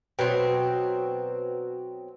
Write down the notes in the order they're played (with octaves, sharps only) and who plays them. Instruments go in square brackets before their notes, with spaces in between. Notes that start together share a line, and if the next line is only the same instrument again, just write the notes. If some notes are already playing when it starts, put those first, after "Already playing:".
[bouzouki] B2 F#3 C4 [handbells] B4 G5